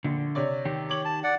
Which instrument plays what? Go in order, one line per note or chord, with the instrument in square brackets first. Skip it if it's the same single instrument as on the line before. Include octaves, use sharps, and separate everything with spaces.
[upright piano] A#1 [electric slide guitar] D3
[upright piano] C3 C#5 D5
[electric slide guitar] D#3 G4
[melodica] C#5 [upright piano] D6 F#7
[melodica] A5
D5 F#5